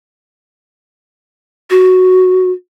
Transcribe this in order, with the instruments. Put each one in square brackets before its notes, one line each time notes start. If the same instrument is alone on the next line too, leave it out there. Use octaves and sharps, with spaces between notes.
[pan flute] F#4